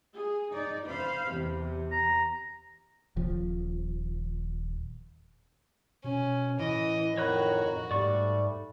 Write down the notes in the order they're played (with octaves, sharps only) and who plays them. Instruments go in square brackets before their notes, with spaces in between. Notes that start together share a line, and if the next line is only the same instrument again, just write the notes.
[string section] G#4
D#4 D5
C5 F5 B5
E2 C3
[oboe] A#5
[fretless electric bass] D#1 F3
[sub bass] B2 [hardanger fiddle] C#4
[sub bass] A2 [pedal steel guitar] E3 [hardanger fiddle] D#5
[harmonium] F2 D#3 A#5 [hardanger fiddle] F#4 [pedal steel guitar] C#5 B5 F#6
[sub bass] G#2 [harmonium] G3 A3 [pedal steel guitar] D5 C#6